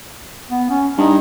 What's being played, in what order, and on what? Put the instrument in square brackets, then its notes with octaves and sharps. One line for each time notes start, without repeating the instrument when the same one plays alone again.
[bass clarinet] B3
C#4
[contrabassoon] G2 [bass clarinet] D#4